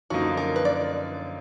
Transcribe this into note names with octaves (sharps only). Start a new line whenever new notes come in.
F#2 D3 F3 A#3 D#4 F#4
A#4
B4
D5